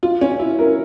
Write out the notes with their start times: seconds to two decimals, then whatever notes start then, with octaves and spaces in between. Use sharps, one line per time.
0.03 F4
0.21 C#4
0.39 E4
0.59 A#4